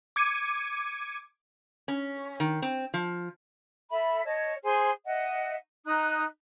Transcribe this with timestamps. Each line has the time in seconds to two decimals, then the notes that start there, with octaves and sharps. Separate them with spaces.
0.16 D6 G#6 C#7 D#7
1.88 C#4
2.40 D#3
2.62 C4
2.94 F3
3.90 A4 E5 B5
4.24 C#5 D#5 A5
4.63 G#4 C5 G#5 C6
5.05 D#5 E5 F#5
5.85 D#4 A#5 D#6 F#6